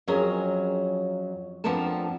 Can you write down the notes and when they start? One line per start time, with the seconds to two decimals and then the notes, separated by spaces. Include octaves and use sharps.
0.08 F2 F#3 C#4 G#4 A#4
1.64 F2 F3 B3 D4 A#4 A5